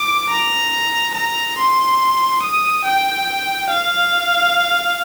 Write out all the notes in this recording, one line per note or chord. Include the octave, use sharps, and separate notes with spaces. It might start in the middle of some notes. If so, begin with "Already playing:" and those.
Already playing: D6
A#5
A#5
C6
D#6
G5
F5